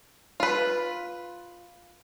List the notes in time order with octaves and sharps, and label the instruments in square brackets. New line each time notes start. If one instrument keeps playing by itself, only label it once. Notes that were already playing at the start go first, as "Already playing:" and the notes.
[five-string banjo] F4 B4